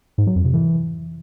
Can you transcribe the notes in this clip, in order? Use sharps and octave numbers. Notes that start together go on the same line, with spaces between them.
G#2
F#3
F2
C3
E3